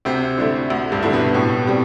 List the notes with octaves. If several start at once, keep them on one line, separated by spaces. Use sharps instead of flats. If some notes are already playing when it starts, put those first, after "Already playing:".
D2 C3 C4
D3 A3 E4
D2
G2 G3
D3 A3 E4
B2 B3
A2
G3 C4